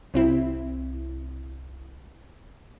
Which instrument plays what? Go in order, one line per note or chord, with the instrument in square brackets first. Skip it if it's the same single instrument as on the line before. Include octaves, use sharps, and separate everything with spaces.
[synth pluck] C2 C4 E4